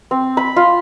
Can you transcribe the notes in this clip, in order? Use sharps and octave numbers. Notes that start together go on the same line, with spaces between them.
C4
B5
F4